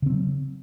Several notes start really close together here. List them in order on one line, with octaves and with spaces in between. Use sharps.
C#3 C4 F#3